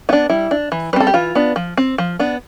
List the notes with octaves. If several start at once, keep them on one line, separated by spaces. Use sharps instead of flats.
B3 D4 E4
G3 E4
D4
E3
G3 C4 A4 B4
G4
E3 F4
B3 D4
F3
C4
F3
B3 D4